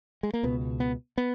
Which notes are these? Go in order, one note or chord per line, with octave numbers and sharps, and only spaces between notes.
G#3
A#3
C#2 B2 B3
B3
B3